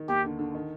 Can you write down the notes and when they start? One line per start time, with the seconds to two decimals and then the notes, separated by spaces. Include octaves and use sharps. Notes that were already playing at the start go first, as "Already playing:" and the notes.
Already playing: D#3
0.08 D#2 G4
0.24 D3
0.39 D3
0.54 D#3